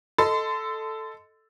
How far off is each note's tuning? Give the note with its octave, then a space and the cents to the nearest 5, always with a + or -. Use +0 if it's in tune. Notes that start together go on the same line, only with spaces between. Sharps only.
A4 +0 D#5 +5 C6 -30